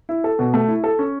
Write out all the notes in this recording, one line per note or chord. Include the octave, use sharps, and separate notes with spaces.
E4
A4
B2
A3
E4
A4
C#4